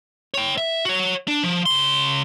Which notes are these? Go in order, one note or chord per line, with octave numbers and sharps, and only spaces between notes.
C#5 G5
E5
F#4 C#5
D4
F3
C#3 C6